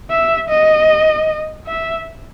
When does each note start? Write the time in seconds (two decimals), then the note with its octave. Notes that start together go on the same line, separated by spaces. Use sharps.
0.11 E5
0.50 D#5
1.66 E5